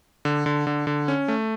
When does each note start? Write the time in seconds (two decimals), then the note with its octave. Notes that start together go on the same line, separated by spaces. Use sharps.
0.25 D3
0.46 D3
0.67 D3
0.87 D3
1.08 C#4
1.28 A3